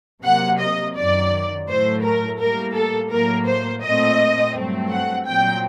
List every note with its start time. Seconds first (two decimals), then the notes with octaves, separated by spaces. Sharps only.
0.24 C3 F#3 A#3 F#5
0.60 D#5
0.96 F#2 D#3 F#3 D5
1.68 A2 F#3 A3 C5
2.03 A#4
2.39 A2 G3 A#3 A#4
2.75 A4
3.11 A2 F#3 A#3 A#4
3.47 C5
3.82 A#2 A3 C4 D#5
4.54 G2 F#3 A3 C4
4.90 F#5
5.26 A#2 F#3 C4 G5